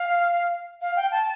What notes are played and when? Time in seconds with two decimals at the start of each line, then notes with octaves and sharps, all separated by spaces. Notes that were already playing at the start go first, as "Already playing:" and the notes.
Already playing: F5
0.81 F5
0.96 G5
1.12 A5